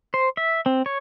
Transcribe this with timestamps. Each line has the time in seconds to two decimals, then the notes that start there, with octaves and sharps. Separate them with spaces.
0.14 C5
0.37 E5
0.66 C4
0.86 C#5